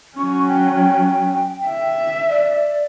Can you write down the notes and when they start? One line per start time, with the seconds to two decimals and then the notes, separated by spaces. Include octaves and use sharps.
0.18 F#3 C#4 C#6
0.49 G5
1.67 E5
2.30 D5